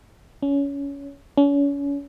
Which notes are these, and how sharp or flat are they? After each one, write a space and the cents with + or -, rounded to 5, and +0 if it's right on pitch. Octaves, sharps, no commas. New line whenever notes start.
C#4 +20
C#4 +35